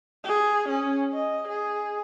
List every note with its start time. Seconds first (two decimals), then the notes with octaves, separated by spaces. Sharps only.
0.24 G#4
0.69 C#4
1.14 D#5
1.48 G#4